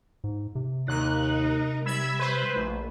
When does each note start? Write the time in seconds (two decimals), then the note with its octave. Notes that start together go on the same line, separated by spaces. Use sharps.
0.24 G#2
0.55 C3
0.88 D#2 D#4 A#4 F#6
1.86 G3 E5 B5 E6 G#6
2.19 B4 C5
2.56 A#1 A3